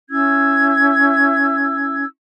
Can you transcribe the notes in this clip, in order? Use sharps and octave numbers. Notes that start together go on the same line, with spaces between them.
C#4 E4 E6 G#6